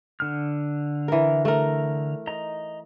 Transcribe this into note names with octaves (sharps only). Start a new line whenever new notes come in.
D3 F6
E3 A#4
A3 A#4
D#5 A#5